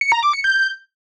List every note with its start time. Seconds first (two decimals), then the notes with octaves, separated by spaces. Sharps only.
0.01 C#7
0.12 A#5
0.23 D6
0.33 C#7
0.44 G6